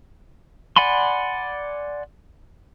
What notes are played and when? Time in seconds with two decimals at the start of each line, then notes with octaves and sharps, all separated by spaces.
0.76 D5 F#5 G#5 B5 C6